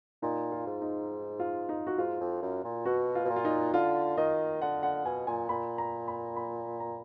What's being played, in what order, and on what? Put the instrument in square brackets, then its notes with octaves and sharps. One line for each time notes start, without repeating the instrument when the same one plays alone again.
[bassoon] A#2 [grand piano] D#4
[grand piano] F4
[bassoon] G#2
[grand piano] D#4
F4
D#4
F#4
[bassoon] G#2 [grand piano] F4
[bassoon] F2
F#2
A#2
[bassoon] B2 [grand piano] F#4
[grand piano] F4
[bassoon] B2
A#2
[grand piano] F4
D#4
[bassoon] D3 [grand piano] F4
[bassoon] D#3 [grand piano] D#5
[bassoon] D3 [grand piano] F#5
[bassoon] D3 [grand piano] F#5
[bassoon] B2 [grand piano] G#5
[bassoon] A#2 [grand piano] G#5
[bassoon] A#2 [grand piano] B5
[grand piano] A#5
B5
B5
A#5